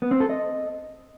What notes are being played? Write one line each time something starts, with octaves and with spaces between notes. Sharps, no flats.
B3
C4
A4
D#5